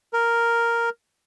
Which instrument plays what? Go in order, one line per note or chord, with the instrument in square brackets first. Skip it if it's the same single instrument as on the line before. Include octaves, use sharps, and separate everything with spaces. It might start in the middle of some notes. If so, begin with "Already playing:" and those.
[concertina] A#4